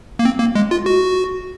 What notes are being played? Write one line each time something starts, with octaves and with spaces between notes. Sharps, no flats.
A#3
C4
A#3
G#3
F4
F#4